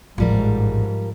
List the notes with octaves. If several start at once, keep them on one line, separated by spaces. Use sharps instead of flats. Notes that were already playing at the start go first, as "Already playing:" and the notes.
A1 D#2 G#2 F3 G3 A#4